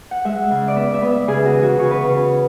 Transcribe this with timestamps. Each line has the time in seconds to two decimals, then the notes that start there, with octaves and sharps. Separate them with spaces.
0.11 F#5
0.25 G#3 E5
0.51 C#3
0.68 D5
0.76 B3 E5
0.94 E5
1.02 B3
1.11 E5
1.27 C#3 G#4
1.45 F#4
1.53 E3
1.62 F#4
1.78 C#3 C#5
1.91 B4
2.01 C#3 C#5